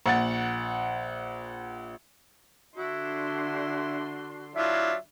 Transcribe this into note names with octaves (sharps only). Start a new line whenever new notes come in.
A#1 F#5 A6
D3 D4 E4 F#4 C6
F#3 D4 E4 F4 E5